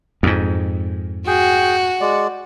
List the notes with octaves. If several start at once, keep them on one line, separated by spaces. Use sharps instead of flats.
F2 G#2
F#4 G#4 G5
G#3 D5